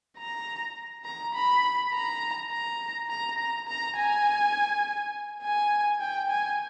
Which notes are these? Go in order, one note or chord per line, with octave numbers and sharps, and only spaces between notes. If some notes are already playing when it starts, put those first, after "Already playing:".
A#5
A#5
B5
A#5
A#5
A#5
A#5
A#5
G#5
G#5
G5
G#5